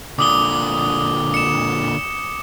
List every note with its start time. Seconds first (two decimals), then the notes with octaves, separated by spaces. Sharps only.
0.19 A#2 D3 D6 D#6 G7
1.34 C#7 E7